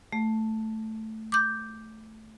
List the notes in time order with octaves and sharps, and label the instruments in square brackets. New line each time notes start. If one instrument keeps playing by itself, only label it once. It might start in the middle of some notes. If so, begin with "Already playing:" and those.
[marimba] A3
D6 G6